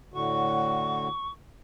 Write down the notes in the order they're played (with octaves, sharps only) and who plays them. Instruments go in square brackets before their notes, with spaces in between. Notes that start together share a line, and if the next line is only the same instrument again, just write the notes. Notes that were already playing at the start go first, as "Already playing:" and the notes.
[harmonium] A2 D3 F#4 [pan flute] C#6